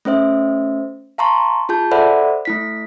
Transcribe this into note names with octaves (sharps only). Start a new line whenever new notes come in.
A3 C#4 C5 E5
F5 A5 A#5 C6 C#6
F4 G#4 A5 G6
A4 C5 D5 E5 F#5 B5
A3 E4 B6